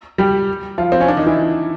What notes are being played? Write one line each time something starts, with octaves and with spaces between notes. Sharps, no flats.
G3 G4
F3 F4
C4
C#4
D4
D#3 D#4
E3 E4